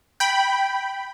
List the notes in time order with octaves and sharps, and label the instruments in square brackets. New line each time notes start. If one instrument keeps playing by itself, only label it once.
[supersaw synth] G5 B5